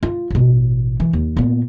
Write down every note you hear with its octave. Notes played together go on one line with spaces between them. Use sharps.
F4
A1 B2
E3
D#2
A#2 B3